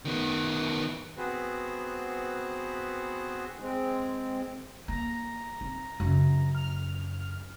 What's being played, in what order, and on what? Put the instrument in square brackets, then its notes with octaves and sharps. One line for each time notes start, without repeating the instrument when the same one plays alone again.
[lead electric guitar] D#3 B3
[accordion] B3 C4 F#4 G#4 B4 C5
[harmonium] G#3 C4
[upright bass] A#3 [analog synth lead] A#5
[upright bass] C4
F#2 C#3
[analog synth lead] F6